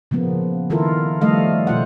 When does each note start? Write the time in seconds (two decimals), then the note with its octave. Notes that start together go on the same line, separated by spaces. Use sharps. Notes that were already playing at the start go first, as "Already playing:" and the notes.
0.11 C#3 F3 A#3 B3
0.70 D#3 E4 F4 A4 A#4
1.21 F3 G3 A3 A4 D#5 F5
1.67 B2 F4 C5 F#5